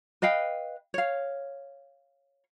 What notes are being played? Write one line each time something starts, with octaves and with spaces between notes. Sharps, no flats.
B4 D#5 F5 G5
C#5 F5